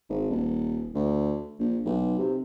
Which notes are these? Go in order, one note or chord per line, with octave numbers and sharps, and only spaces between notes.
G#1
D#1
D2
A#1
B1
C3